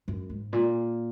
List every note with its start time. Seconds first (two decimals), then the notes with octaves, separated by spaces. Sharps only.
0.08 F#2
0.30 G#2
0.53 A#2